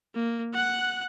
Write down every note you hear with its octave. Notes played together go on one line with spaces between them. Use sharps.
A#3
F#5 F#6